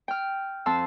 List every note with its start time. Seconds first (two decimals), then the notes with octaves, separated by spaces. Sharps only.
0.08 G5 F6
0.66 F2 A5 C6 E6